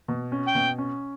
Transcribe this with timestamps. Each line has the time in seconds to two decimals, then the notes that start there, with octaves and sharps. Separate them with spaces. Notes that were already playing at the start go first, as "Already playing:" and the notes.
0.08 B2
0.32 C#4
0.48 G5
0.55 B2
0.78 C#4